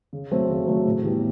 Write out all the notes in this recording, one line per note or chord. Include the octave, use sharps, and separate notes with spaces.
C#3
F#3 A3 C4
C#3
F#3 A3 C4
A2
E3 G3 B3